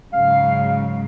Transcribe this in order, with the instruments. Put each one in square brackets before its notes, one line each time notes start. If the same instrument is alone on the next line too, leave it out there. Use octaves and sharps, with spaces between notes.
[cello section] G#2 C#3 F#3 [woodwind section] F5